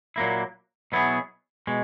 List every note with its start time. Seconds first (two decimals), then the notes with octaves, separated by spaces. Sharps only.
0.16 A#2 F#3 A#3 E4
0.92 B2 F#3 B3 E4 G#4
1.67 B2 G#3